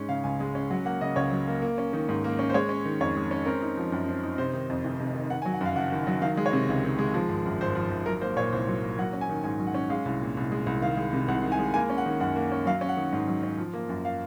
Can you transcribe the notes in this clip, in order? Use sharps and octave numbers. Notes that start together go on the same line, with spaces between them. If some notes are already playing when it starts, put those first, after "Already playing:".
Already playing: G#2 G#3 C#4
C#3 F5
C#2 G#5
G#3
C#4
F#3 F#5
A#3 F#5
C#3 D#5
C#2 C#5
F#3
A#3
A#3
C#4
D#3
G#2
A#3
C#4
C5
G#3 C#5
C#4
D#3
F2 C#5
G#3
C#4
C4 A#4
D#4
F3
F#2
C4
D#4
C3 C5
D#3
F2
F1
C3
D#3
D#3 F#5
G#5
F#3
F#5
F#2 F5
F#1 F#5
D#3
F#3
D#3 F5
G#3
C#5
C3
C#2
D#3
G#3
F3
G#1
F#2
G#1 C5
F3
G#1
F#3 A#4
A#3 C5
A#2 C#5
C2 C5
F#3
A#3
F#3 F#5
C#4
G#5
D#3
G#2 G#5
F#3
F#5
C#4
G#3 F5
C2
A#2
C2
G#3
C2
D#3 F5
G#3
C3
C2 F#5
D#3
G#5
G#3
A#3 G#5
C#4
F#5
D#3
F#2 F#5
A#3
C#4
F#3 F5
C#4
F#5
D#3
G#2
F#3
C#4
F3
A#3
F#2
F5